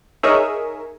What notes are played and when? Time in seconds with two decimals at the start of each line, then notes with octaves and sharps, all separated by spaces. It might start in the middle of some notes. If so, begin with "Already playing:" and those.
0.23 D#4 G#4 A#4 C#5 E5